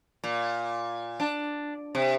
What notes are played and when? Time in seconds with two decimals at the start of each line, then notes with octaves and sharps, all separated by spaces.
0.24 A#2
1.20 D4
1.95 C3